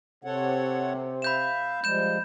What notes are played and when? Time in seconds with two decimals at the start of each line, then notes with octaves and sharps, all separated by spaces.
0.25 C3 A4 C#5 F#5
1.22 E5 F5 B5 G6 E7
1.84 F3 G3 G#3 G6 E7